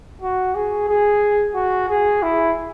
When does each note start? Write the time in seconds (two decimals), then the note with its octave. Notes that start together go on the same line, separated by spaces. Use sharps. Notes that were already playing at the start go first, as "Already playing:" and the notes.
0.22 F#4
0.55 G#4
0.88 G#4
1.55 F#4
1.89 G#4
2.23 E4